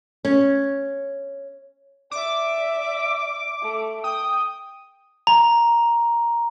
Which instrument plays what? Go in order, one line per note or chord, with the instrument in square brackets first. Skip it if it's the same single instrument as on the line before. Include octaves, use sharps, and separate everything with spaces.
[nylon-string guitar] C#4
[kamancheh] D5 E5 [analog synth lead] D6
[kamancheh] A3
[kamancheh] G5 [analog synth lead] D#6
[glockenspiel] A#5